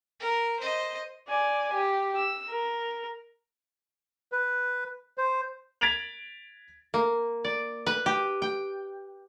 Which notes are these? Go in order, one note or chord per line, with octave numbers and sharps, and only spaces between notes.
A#4
C5 D#5
D5 G#5
G4
E6
A#4
B4
C5
G#6 A6 B6 D7 F7 F#7
A#3
D5
B4
G4
G5